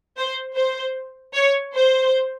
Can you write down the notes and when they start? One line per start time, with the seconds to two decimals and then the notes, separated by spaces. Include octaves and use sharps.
0.17 C5
0.56 C5
1.34 C#5
1.74 C5